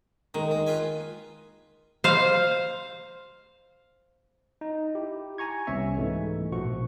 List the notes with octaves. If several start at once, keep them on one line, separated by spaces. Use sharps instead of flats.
D#3 G#3
G#3
F4 B4 G#5
C5 F5
D#4
E4 G4
G#5 A#5 C#6 G#6
C2 C3 B3 C#4 E5 C#6
G#2 E3 G#3 A3
A#1 B2 F3 F#4 C#6